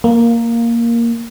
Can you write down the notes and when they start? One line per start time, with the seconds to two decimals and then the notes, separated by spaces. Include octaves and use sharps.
0.04 A#3